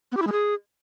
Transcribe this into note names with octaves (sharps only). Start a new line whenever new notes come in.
B3
G4
E4
G#3
G#4